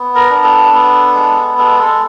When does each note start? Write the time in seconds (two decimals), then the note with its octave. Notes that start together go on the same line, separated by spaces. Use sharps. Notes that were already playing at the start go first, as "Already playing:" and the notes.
Already playing: B3
0.15 A#4
0.30 D4
0.43 A4
0.72 B3
1.15 G#3
1.58 G#3 A4
1.80 A4